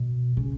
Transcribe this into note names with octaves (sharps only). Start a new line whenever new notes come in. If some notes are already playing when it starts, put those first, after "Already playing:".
Already playing: B2
C#3